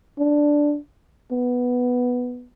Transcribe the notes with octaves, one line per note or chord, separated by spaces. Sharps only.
D4
B3